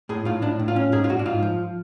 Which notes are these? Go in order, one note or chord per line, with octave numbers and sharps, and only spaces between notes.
A2 G#4
A2 F4
A2 D4
A2
F4
C#4
G#2 G#4
F4
G#2 F#4
D4
G#2 F4
F3